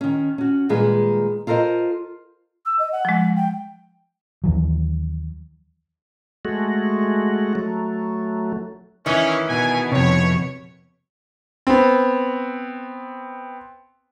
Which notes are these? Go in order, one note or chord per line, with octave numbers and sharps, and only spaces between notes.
D#3 C#4
C#4 F#4
A#2 D#3 G3 G#3 G#4 B4
F4 A4 A#4 C5 D#5
E6
D#5
F#5
F3 G#3
G5
D#2 E3 F#3
G#3 A3 F#4
F#3 A3
D#3 E3 C#4 E4
B2 G#5
F2 C3 C#5
B3 C4